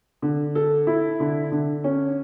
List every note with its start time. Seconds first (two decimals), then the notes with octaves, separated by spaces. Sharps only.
0.22 D3
0.55 A4
0.87 E4
1.20 D3
1.52 D3
1.84 C#4